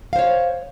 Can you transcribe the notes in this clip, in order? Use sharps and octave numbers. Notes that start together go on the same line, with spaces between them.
C5 C#5 F5